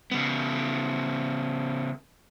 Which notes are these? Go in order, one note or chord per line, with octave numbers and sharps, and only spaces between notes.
C#3 B3